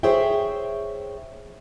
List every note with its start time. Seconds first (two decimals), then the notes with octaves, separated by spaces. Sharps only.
0.03 G#4 C5 C#5 E5 G5